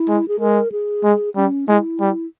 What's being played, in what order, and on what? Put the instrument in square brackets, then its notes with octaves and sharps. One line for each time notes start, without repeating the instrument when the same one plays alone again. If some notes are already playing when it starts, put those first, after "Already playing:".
Already playing: [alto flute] E4
[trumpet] G#3
[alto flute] G#4
[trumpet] G#3 [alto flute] A#4
[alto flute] G#4
[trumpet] G#3
[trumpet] G3 [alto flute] C#4
[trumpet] G#3 [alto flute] E4
[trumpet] G3